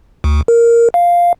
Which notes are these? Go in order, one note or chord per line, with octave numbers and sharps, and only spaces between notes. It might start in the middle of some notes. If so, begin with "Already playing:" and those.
D2
A#4
F5